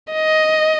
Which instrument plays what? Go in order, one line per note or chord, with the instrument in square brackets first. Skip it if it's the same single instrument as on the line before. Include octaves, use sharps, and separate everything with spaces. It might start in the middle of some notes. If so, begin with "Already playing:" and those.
[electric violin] D#5